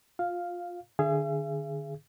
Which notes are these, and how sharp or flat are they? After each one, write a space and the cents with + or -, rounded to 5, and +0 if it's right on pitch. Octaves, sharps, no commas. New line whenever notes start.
F4 +20 F5 +0
D3 +35 G#4 +0 E5 +45